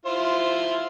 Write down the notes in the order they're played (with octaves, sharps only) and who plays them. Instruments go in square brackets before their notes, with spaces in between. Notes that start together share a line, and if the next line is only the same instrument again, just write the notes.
[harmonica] E4 F4 C5